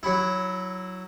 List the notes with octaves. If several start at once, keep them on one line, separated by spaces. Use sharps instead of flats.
F#3 E4